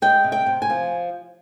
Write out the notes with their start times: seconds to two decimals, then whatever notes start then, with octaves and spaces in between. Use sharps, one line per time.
0.02 G#3 G5
0.24 C3
0.32 G5
0.46 C3
0.62 G#5
0.70 F3